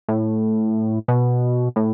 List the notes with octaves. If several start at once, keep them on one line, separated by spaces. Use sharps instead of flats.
A2
B2
A2